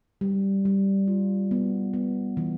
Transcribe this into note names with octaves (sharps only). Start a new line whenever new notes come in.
G3
G3
F4
B3
B3
E3